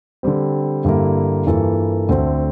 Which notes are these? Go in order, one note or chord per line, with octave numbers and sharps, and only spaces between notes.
D3 G3 C4
G2 D3 G3 A#3 E4
G2 E3 A#3 F4 A4
D2 D3 A3 C4